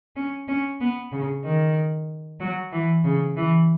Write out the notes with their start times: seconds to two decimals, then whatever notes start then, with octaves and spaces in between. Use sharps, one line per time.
0.16 C#4
0.48 C#4
0.81 B3
1.12 C#3
1.44 D#3
2.40 F#3
2.72 E3
3.04 C#3
3.36 E3